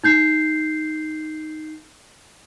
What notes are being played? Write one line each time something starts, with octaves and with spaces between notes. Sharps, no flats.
D#4 G6 C7